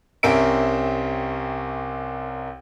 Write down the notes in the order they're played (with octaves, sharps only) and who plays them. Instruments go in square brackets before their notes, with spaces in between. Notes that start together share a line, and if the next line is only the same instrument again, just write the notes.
[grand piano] C2 C4 C#4 A#4 E5 D7